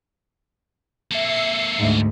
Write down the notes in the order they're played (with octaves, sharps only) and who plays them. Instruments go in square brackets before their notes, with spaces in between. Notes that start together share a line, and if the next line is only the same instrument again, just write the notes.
[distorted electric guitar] A#3 A4 [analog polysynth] E5 C7 C#7
[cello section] D2 G#2